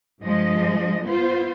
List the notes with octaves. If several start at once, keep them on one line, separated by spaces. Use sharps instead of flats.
G2 F3 G#3 D#5
B3 F4 C5